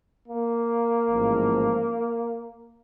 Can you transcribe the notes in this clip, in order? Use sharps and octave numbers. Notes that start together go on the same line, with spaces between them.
A#3
A1 G#2 F3